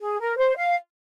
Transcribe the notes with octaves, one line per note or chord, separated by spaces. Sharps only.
G#4
A#4
C5
F5